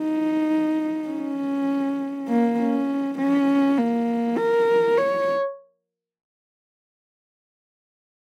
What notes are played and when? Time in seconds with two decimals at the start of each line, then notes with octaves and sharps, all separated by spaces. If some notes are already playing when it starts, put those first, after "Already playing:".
Already playing: D#4
1.08 C#4
2.29 A#3
2.58 C#4
3.19 C#4
3.78 A#3
4.38 A#4
4.97 C#5